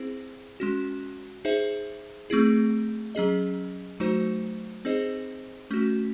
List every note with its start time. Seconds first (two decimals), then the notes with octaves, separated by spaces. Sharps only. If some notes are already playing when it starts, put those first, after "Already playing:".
Already playing: C4 E4 G#4 C5
0.60 G#3 C#4 F#4
1.45 D#4 G#4 C5 E5
2.30 A3 C4 E4 G#4
3.15 F#3 C#4 G#4 D#5
4.00 F#3 A3 D#4 F#4 C5
4.85 C4 D#4 G#4 C5 D#5
5.71 A3 C#4 F#4